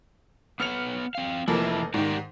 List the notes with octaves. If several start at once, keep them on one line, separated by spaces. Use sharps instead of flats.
B3 B4 C#5 F6 C#7 F7
C4 F5
F1 F2 A2 E3 A#3 E4
G#2 D#3 G4 A#4 D5